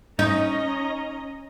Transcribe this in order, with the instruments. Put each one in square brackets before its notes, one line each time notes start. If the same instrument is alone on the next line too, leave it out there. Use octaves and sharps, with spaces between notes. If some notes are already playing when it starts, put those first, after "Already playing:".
[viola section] C#4 D#5 A#5 [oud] D#4